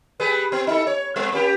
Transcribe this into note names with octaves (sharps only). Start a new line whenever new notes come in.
G3 G#4 B4
B3
D#4 A4
C#5
G3 B3
A#3 C#4 G4